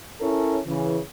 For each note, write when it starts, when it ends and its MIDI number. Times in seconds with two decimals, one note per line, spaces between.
0.21 0.59 61
0.21 0.59 64
0.21 0.59 69
0.21 0.59 70
0.21 0.59 73
0.66 0.98 49
0.66 0.98 52